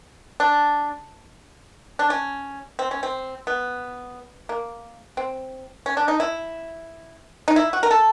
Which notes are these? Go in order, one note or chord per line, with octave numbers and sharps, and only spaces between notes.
D4
D4
C#4
C4
C#4
C4
B3
A#3
C4
C#4
D4
D#4
E4
D#4
E4
F#4
A#4
A4